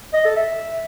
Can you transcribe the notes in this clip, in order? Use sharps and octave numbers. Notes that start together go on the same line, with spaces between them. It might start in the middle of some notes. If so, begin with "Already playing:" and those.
D#5
A4
E5